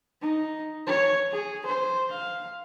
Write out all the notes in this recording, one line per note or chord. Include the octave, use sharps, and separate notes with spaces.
D#4
C#5
G#4
C5
F5